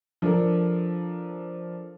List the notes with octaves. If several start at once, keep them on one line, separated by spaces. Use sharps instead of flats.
F3 D4 A4 A#4